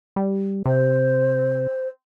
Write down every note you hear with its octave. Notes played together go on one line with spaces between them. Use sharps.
G3
C3 C5